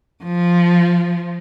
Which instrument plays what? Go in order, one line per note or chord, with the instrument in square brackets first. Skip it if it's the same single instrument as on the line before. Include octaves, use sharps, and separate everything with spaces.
[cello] F3